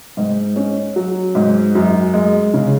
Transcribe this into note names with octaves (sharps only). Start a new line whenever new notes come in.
G#2
C#4
F#3
G#2
F#2
G#3
C#3